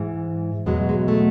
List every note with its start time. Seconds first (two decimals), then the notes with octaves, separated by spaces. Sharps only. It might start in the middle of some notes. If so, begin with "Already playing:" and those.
Already playing: G#2 E3
0.66 E2 B2 F#3 G#3
0.89 G#3
1.08 A3